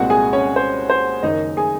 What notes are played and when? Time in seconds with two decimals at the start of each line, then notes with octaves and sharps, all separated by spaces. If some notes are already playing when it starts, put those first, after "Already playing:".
Already playing: C2 A#2 G#3 C4 F#4 F#5
0.10 G#4 G#5
0.33 C#4 C#5
0.56 C5
0.90 C5
1.23 F#1 F#2 D#3 D#4 D#5
1.57 G#4 G#5